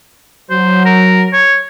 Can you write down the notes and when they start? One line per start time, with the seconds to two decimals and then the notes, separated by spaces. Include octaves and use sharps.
0.50 F#3 C5
0.86 A#4
1.33 C#5